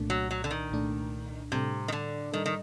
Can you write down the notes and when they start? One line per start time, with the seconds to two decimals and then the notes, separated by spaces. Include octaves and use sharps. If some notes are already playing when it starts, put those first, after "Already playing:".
Already playing: C2 A#2 A3 D4
0.10 F#3
0.31 F#3
0.44 D3
0.51 D#3
0.71 C2 A#2 A3 D4
1.52 A2 C3 G3 D4 A4
1.88 D#3
1.92 D3
2.32 A2 D#3 G3 D4 A4
2.46 D#3